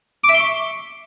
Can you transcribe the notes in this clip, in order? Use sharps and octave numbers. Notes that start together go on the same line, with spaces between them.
D6
E5
C6
C#6